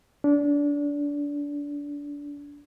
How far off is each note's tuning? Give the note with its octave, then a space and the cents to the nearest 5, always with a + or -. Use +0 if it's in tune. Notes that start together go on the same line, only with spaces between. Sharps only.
D4 -25